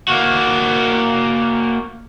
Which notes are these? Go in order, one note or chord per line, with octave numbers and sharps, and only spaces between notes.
A#3 F#4